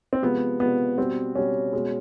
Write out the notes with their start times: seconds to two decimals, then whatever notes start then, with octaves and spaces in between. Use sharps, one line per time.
0.13 C4
0.22 C3 F3 G#3 B3
0.60 C3 F3 G#3 B3
0.98 B2 G3 C4
1.35 B2 G3 C#4
1.73 B2 G#3